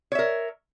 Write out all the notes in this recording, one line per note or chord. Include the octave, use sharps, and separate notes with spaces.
A#4 C#5 E5